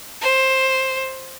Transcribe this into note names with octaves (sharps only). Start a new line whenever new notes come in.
C5